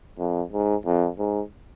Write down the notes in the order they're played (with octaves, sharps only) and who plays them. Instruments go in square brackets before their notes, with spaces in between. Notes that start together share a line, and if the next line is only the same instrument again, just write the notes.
[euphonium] F2
G#2
F2
G#2